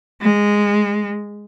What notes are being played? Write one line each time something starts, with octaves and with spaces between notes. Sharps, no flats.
G#3